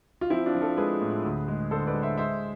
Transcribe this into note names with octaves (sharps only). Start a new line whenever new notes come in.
F4
F3 C4 E4
D4 F4
F3
F4 A4
G#3 G#4 B4
A2
D2
G#3
D3 A4 C5
B4 D5
G#3
C5 E5
G#3 C5 E5